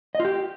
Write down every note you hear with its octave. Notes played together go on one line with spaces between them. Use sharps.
D#5
F4
G4